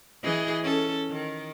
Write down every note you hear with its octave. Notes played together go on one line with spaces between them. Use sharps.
E3 G#4 D#5
C#4 A4
D#3